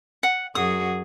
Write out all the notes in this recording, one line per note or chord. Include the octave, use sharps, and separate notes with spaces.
F#5
F#2 F#4 G#4 D#6